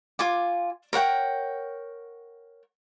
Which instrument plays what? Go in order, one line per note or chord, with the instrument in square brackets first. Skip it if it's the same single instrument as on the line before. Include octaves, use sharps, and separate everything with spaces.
[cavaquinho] F4 G#5 D6
A#4 C#5 F#5 G5